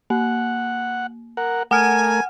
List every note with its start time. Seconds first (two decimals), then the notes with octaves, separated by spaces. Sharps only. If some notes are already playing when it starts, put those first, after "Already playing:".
0.10 A#3 F#5
1.37 A#4 F#5
1.71 A3 A#4 F#5 G#5 F6